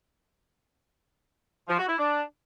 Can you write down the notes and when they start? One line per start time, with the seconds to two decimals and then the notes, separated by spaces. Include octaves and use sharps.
1.68 F3
1.78 F#4
1.88 E4
1.98 D4